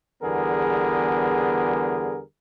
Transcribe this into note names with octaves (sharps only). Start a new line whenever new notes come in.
E2 D3 G3 B3 G#4 A#4